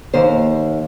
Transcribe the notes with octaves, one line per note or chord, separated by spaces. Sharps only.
D#2 C5